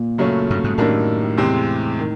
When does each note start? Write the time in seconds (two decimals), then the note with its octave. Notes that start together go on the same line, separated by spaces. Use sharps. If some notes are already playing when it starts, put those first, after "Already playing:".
Already playing: A#2
0.18 F#2 C#3 F#3 A3 C#4
0.50 G2
0.64 G#2
0.78 F#2 A2 D#3 G3 A#3 D4
1.37 E2 C3 E3 G#3 C4
2.00 D#3